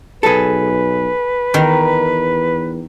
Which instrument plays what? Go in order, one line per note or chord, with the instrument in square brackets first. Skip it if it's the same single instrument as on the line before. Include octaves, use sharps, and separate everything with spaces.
[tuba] B1 [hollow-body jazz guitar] G#4 A4 [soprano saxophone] B4
[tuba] E2 [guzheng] D#3 A#4